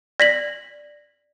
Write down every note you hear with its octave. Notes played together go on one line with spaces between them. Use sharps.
D5 A#6 B6 F#7